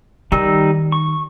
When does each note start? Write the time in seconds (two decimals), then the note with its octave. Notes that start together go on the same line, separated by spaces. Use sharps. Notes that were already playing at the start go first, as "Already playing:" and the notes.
0.32 D#3 G3 D#4 E6
0.92 C#6